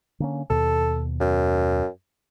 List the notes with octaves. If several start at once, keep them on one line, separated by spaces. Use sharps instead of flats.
D3 A#3 C#4
D#2 B2 A4
F#2